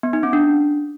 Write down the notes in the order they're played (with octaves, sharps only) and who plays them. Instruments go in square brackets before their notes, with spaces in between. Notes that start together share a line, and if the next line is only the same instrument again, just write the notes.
[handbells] B3
D#4
C#4
D4